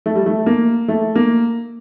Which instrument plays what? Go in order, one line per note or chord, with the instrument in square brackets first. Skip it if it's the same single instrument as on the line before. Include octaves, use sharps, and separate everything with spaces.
[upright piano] A3
G3
A3
A#3
A3
A#3